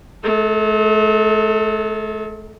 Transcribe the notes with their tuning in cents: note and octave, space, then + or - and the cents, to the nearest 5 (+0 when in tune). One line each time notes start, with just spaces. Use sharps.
A3 -45 A4 +25